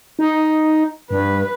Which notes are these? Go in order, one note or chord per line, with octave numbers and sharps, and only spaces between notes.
D#4
G2 B4